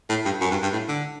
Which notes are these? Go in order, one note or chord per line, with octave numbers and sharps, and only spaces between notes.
A2
G2
F#2
G2
G2
A2
D3